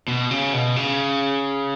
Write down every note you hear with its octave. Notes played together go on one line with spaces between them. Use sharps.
B2
C#3
B2
C#3